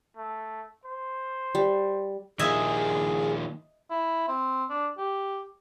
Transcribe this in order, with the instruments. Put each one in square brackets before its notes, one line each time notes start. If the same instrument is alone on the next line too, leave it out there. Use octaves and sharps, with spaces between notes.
[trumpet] A3
C5
[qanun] G3
[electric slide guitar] D#3 F3 A#3 [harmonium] G#4 [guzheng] D#5 E5 G#5
[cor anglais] E4
C4
D4
G4